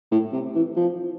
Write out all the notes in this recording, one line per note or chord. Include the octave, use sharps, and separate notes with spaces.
A2
C3
E3
F3